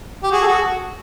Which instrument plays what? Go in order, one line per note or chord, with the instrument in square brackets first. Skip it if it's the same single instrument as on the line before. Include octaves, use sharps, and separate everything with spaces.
[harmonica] G4
F#4 G#4
A4
F#4 G#4